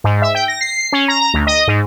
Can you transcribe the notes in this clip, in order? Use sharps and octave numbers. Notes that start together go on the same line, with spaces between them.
G#2
E5
G5
A#6
C7
C#4
A#5
A#5
D2
D#5
G#2